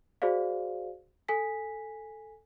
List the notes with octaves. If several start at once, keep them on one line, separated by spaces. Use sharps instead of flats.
F#4 G#4 C5 D5 F5
A4 G#5 B6